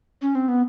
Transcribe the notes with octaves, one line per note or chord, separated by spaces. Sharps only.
C#4
C4
B3